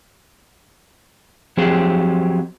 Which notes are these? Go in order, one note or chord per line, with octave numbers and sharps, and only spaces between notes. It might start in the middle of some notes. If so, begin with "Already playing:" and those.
F3 F#3 C4 G4 G#4